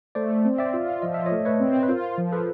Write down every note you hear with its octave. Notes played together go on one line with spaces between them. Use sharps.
A3 C5 D5
C4
D5 E5
F4
F3 D#5
E5
A3 C#5 D#5
B4 C#5
C4
B4
F4 A#4 C5
F3
A4 B4